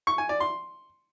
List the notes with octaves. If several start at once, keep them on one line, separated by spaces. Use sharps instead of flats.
C#6
G#5
D5
C6